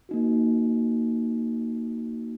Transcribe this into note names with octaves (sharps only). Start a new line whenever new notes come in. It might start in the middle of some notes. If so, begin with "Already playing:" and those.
A#3 D#4 F#4